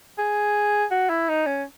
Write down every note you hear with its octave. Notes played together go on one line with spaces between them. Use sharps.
G#4
F#4
E4
D#4
C#4